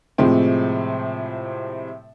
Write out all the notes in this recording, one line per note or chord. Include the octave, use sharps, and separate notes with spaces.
A2 C3 F3 G#3 C4